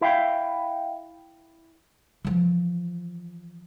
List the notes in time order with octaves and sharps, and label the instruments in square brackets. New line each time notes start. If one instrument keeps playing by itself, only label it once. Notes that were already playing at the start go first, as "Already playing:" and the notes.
[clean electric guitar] E4 E5 F5 G5
[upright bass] E3 F3